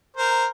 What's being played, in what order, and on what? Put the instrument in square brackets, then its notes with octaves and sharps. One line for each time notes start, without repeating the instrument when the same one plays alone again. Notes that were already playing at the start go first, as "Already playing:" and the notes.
[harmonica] A#4 C5